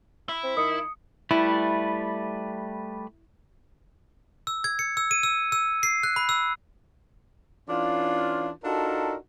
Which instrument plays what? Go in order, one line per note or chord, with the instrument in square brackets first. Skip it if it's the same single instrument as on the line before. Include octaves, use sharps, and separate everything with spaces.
[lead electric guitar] E4
[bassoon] C4
[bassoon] D#3 [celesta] D#6 C#7
[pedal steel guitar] G3 A3 B4 [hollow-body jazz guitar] E4
[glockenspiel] E6
G#6
C#7
E6
D#7
E6
E6
C7
F#6
B5
E6
[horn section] E3 C#4 D4 F4
D4 D#4 F4 F#4 A4 A#4